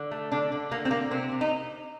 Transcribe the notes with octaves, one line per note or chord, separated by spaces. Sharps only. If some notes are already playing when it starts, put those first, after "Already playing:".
Already playing: D3
A3
D3 D4
D3
D3 A#3
C4
D3 A#3
C3 C4
C3
D#4